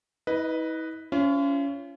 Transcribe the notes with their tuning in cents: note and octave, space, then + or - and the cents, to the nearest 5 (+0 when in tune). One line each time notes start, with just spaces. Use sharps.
E4 -45 B4 +0 D#5 -5
C#4 +20 F4 -40 C5 +10